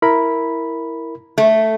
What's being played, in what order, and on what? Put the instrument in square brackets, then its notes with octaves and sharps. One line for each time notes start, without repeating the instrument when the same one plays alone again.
[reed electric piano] E4 A#4 B5
[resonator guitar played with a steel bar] A3